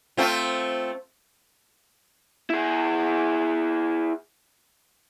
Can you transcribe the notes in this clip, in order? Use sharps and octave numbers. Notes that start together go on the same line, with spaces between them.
A3 C4 F4
E4 G#4